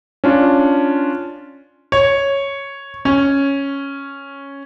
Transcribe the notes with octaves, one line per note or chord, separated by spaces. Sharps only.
C#4 D4 F4
C#5
C#4